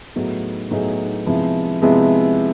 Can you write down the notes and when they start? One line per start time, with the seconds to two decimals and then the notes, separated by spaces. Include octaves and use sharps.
0.15 A2 F#3 B3 D#4 G#4
0.71 A2 F#3 B3 D#4 G#4
1.26 C3 F3 G#3 B3 E4
1.82 C3 F3 G#3 B3 E4